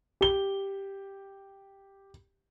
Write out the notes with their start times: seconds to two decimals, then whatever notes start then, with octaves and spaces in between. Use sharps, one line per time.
0.21 G4 G7